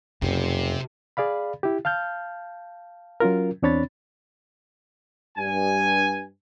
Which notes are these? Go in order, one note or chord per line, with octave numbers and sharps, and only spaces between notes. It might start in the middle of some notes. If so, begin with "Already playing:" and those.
F#1 F2 C3
G#4 D5 F5 B5
E4 G4
F5 A5 F6 G6
F#3 C#4 F4 A#4
E2 C4 D4 C#5 B5 A6
G2 G#5